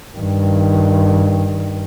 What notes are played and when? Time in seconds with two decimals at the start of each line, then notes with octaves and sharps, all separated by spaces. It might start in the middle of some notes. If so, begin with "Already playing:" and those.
0.17 G2 D#3